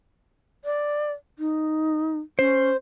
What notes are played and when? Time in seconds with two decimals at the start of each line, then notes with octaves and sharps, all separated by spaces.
0.65 D5
1.39 D#4
2.39 C#4 C5